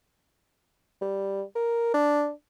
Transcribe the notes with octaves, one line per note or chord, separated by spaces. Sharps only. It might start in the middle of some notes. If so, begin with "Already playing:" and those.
G3
A#4
D4